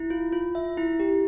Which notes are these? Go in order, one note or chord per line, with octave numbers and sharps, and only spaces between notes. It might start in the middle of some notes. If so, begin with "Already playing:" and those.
Already playing: E4
F4
F4
E5
E4
G4